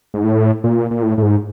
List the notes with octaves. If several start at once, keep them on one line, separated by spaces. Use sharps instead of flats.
G#2
A2
A#2
A#2
A2
A2
G#2